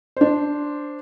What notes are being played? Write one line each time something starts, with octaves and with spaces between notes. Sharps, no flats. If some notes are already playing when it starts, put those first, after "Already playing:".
D4 C5